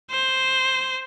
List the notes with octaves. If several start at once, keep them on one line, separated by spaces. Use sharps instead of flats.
C5